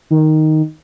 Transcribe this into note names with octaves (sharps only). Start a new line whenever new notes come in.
D#3